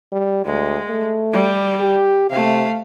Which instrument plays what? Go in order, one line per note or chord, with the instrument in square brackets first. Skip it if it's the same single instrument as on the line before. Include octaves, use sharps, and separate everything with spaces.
[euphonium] G3
[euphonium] D2 [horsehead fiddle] G#3
[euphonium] A3
[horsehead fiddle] G3
[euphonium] G4
[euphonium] C3 [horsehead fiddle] A3 F5